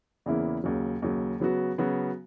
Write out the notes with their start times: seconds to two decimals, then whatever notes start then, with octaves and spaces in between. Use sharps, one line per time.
0.26 E2 C#3 E3 A#3 E4
0.64 D#2 C#3 F#3
1.02 D#2 C#3 F#3
1.40 C#3 F#3 B3 F#4
1.78 C#3 F#3 B3 F#4